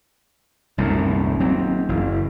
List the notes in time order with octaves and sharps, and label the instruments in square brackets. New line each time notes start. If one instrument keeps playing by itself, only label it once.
[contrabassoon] D#1 [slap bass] C2 F#2 A2
[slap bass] F#3 C4
[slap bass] F#1 [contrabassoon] E3